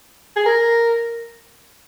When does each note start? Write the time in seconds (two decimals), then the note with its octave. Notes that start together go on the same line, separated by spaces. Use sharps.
0.36 G#4
0.46 A#4